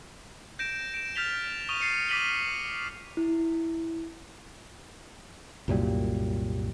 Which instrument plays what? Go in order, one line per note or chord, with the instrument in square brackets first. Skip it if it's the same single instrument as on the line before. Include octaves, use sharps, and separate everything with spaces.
[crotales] G6 A#6 D7 E7
D7 E7
F6 G6 A6 B6 F7 G7
C#6 D#6 D#7 F7 G7
A6 C7 C#7 D#7
D6 F6 B6 D#7 F#7 G7
[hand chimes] E4
[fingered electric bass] C2 F#2 A#2 G3